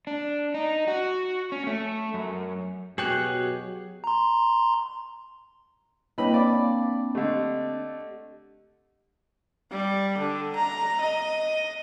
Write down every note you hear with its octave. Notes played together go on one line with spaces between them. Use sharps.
D4
D#4
F#4
C#4
A3
F#2
B2 F#3 G4 G#4 C#5 G5 F#6
A#5 C6
A#3 C4 D4 E4 B4 C#5 D#5 B5
D5 F5 B5 D6
D3 A3 G4 D#5
G3
D3
A#5
D#5